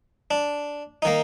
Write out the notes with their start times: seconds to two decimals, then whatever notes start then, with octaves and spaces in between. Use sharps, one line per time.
0.31 D4
1.02 D#3 A#3 D#4